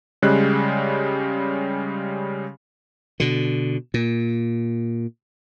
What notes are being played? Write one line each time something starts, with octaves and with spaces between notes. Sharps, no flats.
C#3 G3 G#3 F#6
B2 D3
A#2